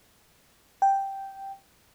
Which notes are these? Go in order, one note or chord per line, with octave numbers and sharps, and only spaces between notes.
G5